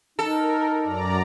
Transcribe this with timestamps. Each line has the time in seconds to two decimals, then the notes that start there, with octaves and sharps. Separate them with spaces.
0.19 D#4 A4 A#4
0.81 F#2 D5 A#5